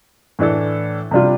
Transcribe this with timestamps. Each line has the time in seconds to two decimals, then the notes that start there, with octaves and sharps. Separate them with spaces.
0.39 A2 E3 A3 D4 A4
1.11 C3 G3 D4 F4